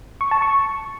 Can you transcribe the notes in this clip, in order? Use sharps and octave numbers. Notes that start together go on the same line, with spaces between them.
C#6
A5
C#6